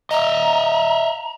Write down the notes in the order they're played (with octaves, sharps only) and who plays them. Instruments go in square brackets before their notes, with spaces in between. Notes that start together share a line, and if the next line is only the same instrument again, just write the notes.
[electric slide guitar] D#5 E5 [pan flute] A#5